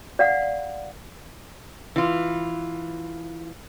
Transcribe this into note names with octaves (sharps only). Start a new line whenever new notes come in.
D5 F5 F#5
E3 F4